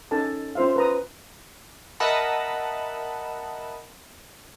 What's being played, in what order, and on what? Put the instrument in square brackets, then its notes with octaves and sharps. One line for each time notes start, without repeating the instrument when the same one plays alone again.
[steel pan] C#4 D#4 A4 G#5 A5
C#4 F4 C5 E5 F5
B4 A#5 D#6
[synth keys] A#4 D#5 E5 F#5 A5 B5